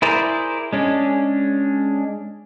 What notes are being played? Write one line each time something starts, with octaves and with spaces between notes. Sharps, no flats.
E4 G#4 A#4 C5 D5
G#3 C#4 D4